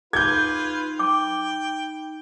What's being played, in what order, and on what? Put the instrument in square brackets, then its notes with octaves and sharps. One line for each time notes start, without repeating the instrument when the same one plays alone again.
[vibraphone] D#4 B5 [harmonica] F4 B4 [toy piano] G#4 [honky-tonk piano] G6 G#6
[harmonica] G5 [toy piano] D6